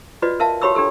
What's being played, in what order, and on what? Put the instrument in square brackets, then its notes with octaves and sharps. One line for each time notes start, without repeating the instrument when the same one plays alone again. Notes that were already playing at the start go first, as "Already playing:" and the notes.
[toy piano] F4 F#4 B4 D5 D#5
A#4 E5 F5 A5
F#4 G4 C#5 B5 D6 E6
D4 G4 A4 E6